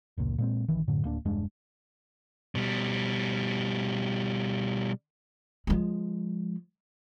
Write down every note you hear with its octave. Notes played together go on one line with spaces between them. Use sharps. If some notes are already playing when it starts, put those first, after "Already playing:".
F1 C#2 A#2
A#2 G#3 C4
A#1 D#3 E3
F#2 A2 D3
D1 A#3 D4
E1 G2 G#3 D4
B2 G3
F3 G#3